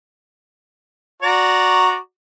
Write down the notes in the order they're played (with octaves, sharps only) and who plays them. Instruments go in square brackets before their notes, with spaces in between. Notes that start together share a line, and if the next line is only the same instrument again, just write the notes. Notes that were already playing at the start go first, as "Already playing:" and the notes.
[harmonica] F#4 D5 A#5